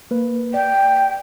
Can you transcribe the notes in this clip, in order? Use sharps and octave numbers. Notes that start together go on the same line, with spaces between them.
A#3 B4
D5 G5